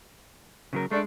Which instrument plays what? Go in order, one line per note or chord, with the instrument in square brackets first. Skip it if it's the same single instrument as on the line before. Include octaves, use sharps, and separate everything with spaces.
[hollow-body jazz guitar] C#3 F#3 A#4
[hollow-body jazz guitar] G#3 [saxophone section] A3 D4